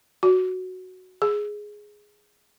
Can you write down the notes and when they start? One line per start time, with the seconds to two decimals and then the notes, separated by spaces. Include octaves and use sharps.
0.23 F#4
1.22 G#4